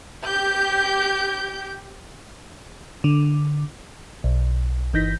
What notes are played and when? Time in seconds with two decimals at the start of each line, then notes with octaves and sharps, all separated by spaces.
0.25 G4 G6
3.04 D3
4.24 B1
4.93 G1 E3 D#4 G6 A#6 B6